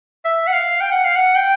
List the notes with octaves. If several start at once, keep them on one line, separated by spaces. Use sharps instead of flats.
E5
F#5
F5
G5
F#5
F5
F#5
G5